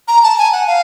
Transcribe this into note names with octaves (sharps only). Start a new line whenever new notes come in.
A#5
A5
G#5
F#5
F5